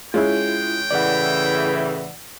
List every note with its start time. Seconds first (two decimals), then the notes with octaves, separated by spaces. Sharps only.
0.14 G#3 C#4 E4 F4 G5
0.91 A2 C#3 E3 D5 F#5